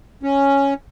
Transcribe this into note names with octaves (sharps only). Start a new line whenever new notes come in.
C#4